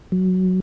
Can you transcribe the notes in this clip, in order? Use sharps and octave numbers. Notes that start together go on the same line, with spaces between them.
F#3